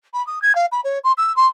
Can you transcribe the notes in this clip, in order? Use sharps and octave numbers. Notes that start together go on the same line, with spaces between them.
B5
D#6
G#6
F5
B5
C#5
C6
E6
C6